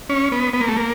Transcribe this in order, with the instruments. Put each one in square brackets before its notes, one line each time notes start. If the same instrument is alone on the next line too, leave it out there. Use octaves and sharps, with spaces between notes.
[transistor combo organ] C#4
B3
B3
A#3
A3
A#3